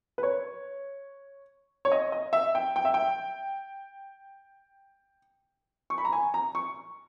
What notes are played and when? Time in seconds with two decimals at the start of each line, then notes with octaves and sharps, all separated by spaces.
0.18 B4
0.23 C#5
1.85 C#5
1.92 D#5
2.12 D#5
2.33 E5
2.55 G5
2.76 G5
2.85 E5
2.94 G5
5.90 C#6
5.98 B5
6.05 A#5
6.13 G#5
6.34 A#5
6.55 C#6